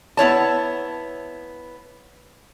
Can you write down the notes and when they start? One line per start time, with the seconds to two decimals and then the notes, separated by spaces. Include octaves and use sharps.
0.17 B3 E4 C#5 A5